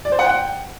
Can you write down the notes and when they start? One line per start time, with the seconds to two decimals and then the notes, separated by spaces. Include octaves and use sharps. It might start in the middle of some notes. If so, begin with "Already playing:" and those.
0.05 D5
0.12 C5
0.19 F#5
0.26 G5